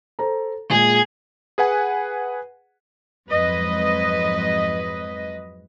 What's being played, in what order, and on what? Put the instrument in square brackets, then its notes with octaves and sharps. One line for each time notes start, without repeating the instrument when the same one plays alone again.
[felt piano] A4 C5 A#5
[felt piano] A#2 G#3 [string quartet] G#4 G#6
[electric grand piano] G#4 B4 F#5 G#5
[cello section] F2 G#2 F#3 B4 D#5